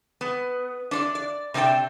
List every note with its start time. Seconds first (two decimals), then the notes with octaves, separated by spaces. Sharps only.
0.21 B3
0.91 D4 C#5 D5
1.15 D5
1.54 C3 C4 D4 C5 G5